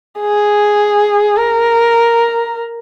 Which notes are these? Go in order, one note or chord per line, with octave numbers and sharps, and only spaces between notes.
G#4
A#4